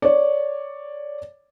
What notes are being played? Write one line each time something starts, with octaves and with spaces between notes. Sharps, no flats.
C#5 D5